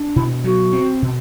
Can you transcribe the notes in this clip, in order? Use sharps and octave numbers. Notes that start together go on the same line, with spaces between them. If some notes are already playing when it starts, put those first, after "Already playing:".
Already playing: D4
B2 E4
F#3 F#4
C4
B2